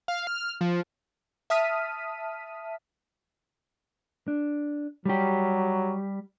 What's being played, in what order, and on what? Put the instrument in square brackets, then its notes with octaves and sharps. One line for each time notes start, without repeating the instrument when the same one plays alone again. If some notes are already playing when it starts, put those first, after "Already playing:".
[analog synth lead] F5
F6
F3
[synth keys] E5 A5 D#6 F6 B6 D#7
[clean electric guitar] D4
[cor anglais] F#3 [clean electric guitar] G3 G4